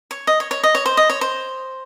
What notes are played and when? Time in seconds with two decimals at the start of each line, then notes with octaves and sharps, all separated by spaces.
0.11 C#5
0.27 D#5
0.40 C#5
0.51 C#5
0.63 D#5
0.75 C#5
0.86 C5
0.97 D#5
1.09 C#5
1.21 C5